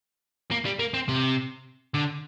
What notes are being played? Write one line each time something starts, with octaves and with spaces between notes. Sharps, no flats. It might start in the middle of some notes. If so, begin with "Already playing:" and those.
A#3
G3
A#3
C4
C3
D3